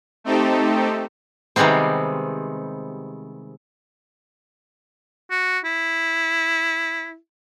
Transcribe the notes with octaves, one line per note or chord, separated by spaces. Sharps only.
A3 C4 D#4 G4 A4
C3 D#3 G3 G#3 B3 C4
F#4
E4